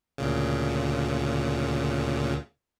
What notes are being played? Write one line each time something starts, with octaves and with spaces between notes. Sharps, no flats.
D2 A#2 C#3